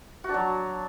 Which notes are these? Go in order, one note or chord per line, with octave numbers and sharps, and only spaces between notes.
F#4
D4
F#3